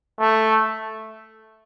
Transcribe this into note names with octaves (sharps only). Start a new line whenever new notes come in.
A3